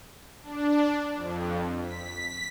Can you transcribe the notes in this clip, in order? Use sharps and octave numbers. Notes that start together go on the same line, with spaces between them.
D4
F2
B6